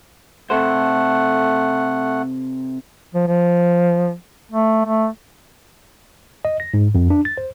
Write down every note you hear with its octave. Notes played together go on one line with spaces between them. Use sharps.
C3 A3 A4 C5 F#5
F3
F3
A3
A3
D#5
A#6
G#2
F2
D4
A6
C5